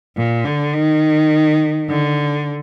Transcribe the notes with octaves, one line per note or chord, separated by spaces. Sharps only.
A#2
D3
D#3
D3